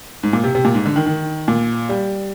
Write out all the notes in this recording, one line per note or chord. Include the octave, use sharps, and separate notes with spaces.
G#2
A#2
C3
C3
A#2
G#2
D3
D#3
D#3
A#2
G3